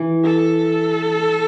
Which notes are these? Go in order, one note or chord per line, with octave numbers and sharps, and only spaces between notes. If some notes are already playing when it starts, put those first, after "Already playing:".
Already playing: E3
A4